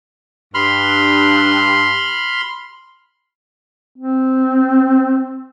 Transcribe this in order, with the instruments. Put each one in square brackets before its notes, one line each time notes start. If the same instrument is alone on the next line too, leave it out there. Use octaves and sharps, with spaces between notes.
[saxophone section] G2 [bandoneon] B5 C6 F6
[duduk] C4